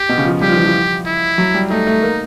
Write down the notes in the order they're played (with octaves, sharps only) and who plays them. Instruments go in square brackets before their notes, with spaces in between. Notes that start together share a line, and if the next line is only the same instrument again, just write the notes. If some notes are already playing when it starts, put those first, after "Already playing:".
Already playing: [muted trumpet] G4
[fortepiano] B2
C#3
F3
[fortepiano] G3 [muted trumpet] G4
[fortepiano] F3
E3
F3
[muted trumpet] E4
[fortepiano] F#3
G3
[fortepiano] A3 [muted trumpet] D#4
[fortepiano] A3
A#3